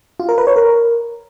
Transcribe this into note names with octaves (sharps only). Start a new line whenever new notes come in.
F4
A#4
B4
C#5
A#4